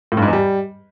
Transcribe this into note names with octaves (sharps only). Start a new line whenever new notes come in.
A2
G2
G#2
E2
G3